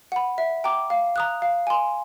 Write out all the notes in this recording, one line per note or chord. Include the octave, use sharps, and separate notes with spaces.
F#5 B5
E5
G5 A#5 D6
F5
A#5 D#6 F#6
F5
G#5 C6